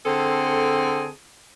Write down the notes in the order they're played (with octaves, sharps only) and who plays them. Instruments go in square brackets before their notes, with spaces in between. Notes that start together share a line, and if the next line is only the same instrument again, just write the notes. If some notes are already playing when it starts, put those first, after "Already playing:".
[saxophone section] D3 G#4 A4 [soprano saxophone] C4